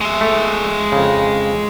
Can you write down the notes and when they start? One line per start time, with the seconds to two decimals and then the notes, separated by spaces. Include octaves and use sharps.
0.01 G#3 E5
0.21 A3
0.92 F2 C#3